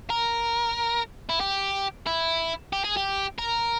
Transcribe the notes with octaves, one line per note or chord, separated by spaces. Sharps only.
A#4
E4
G4
E4
G4
G#4
G4
A#4